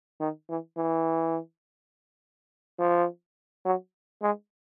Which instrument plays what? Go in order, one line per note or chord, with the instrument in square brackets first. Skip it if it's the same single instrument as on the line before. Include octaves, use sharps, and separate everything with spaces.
[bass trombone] D#3
E3
E3
F3
F#3
G#3